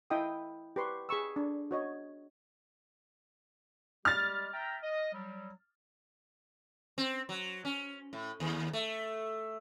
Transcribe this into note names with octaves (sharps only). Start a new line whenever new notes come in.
E4 D#5 F5 G5 D#6
G4 B4 C6 C#6
G#4 B5 C#6 E6
D4
F#4 C#5 D#5
G3 G#3 G4 F6 A6
E5 G5 A#5
D#5
F#3 G3
C4
F#3
C#4
A2
D#2
A3